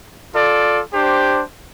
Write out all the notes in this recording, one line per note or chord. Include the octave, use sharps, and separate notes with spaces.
F4 A4 D5
D4 G4 C5